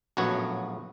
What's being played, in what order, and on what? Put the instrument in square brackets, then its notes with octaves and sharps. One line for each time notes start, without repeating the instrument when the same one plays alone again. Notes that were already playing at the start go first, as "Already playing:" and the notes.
[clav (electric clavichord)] A#1 F#2 A2 B3 F#4 C#5